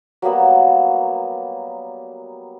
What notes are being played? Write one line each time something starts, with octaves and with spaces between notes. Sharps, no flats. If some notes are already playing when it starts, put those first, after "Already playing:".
F#3 G3 A#3 B3